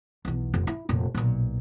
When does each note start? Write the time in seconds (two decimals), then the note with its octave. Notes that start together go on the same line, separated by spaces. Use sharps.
0.25 B1 E2
0.54 F1
0.67 E4
0.89 F1 A#2
1.14 B1 A#2